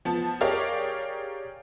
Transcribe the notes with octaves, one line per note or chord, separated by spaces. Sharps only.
F3 B3 A5
G4 G#4 A#4 C#5 D5 F5